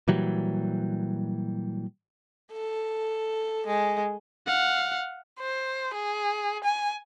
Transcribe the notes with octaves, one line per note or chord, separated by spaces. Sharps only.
A#2 E3 F#3 G3
A4
G#3
F5 F#5
C5
G#4
G#5